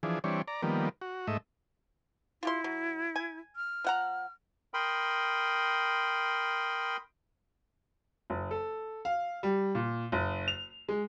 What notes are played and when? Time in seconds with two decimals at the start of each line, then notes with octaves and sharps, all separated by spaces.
0.03 E3 F3 D4 G#4
0.24 E3 G3 C4 D4 C#5
0.48 D5 A#5
0.62 D#3 F3 G3 A#3 B3
1.01 F#4
1.27 G#2 A3 D#5 E5
2.43 E4 F4 G4 C6
2.64 F#3
3.16 G#5
3.56 F6
3.84 F3 F#5 A#5
4.74 A#4 G5 B5 C6 D#6
8.30 F#1
8.51 A4
9.05 F5
9.43 G3
9.75 A#2
10.12 F#1
10.48 F7
10.89 G#3